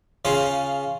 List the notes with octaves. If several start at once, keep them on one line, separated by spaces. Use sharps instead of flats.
C#3 C#4 F4